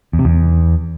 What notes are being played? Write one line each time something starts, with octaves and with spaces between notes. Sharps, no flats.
E2
C3
E2